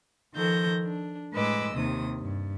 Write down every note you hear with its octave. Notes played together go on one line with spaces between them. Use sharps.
D#3 F3 A4 G6 A#6
D4
A2 G#3 B4 D#5 D6 E6
D#2 C3 D#3 D#6
G2